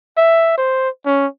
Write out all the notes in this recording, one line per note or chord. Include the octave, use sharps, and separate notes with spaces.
E5
C5
C#4